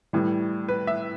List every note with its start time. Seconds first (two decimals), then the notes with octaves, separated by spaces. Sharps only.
0.13 A2 E3 G3
0.69 B4
0.87 E5